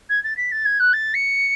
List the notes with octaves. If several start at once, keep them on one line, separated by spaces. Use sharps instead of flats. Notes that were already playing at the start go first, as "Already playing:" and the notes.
G#6
A6
B6
A6
G#6
F#6
A6
C#7